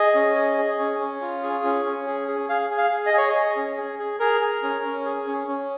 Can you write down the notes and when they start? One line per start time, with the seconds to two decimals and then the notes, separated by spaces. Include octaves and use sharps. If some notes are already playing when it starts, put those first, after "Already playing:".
Already playing: G#4 D#5
0.15 C#4
0.35 G#4
0.58 G#4
0.79 C#4
0.99 C#4
1.21 F4
1.43 G#4
1.64 C#4
1.86 C#4
2.06 G#4
2.28 G#4
2.49 G#4 F5
2.70 G#4
2.78 F5
2.92 G#4
3.06 D#5
3.14 G#4 C#5
3.29 D#5
3.35 G#4
3.56 C#4
3.78 G#4
3.99 G#4
4.20 G#4 A#4
4.41 G#4
4.63 C#4
4.84 C#4
5.05 G#4
5.27 C#4
5.48 C#4